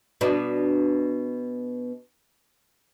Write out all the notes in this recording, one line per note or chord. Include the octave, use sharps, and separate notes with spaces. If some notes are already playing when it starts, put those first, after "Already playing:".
B2 D4